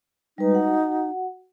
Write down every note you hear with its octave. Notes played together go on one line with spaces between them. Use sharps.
G3 G#3 D#4 B4
F#4 F#5